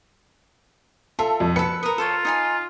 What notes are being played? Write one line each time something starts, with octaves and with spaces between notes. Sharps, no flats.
F4 A4 E5
F2
A4 B4 C#7
A#4 B4 D#6
F4 A4 C5 C#5
D#4 G#5 C6